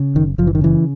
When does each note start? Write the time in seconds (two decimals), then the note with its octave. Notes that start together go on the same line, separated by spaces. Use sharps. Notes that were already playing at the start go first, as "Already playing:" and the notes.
Already playing: C#3
0.15 F#1 D#3
0.38 F#1 F3
0.47 E3
0.55 D#3
0.61 C#3 E3